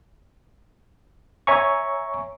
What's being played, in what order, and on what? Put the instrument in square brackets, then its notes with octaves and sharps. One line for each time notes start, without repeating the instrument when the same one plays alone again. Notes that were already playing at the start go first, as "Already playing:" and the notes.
[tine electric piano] C#5 E5 G#5 A#5 C#6